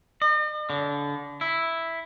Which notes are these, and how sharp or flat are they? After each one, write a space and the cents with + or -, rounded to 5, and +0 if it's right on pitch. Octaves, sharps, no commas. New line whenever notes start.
D#5 -45
D3 -30
E4 +0